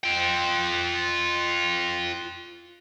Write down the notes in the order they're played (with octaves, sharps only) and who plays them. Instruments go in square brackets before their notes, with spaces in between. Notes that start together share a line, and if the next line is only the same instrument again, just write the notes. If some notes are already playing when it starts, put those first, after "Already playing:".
[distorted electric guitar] F4 G5